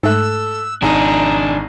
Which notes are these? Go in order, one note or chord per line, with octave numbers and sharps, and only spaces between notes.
G#2 A3 A4 E6 F#6
G#1 D4 D#4 G#4 A#5